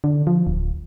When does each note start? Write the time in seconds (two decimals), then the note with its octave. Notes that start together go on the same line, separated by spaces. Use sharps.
0.04 D3
0.27 F3
0.47 D1